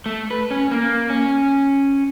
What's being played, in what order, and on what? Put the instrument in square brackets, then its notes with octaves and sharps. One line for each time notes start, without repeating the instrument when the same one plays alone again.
[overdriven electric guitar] A3
B4
C#4
A#3
C#4